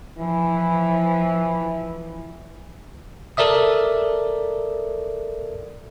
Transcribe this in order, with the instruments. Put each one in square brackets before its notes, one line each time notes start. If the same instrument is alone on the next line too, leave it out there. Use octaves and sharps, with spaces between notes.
[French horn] E3 [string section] F3
[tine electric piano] A4 A#4 D5 E5 D#6